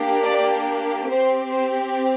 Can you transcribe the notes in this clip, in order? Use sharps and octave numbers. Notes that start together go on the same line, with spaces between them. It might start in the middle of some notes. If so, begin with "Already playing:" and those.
Already playing: A#3 D4 G4
D5
C4 G4 C5
C5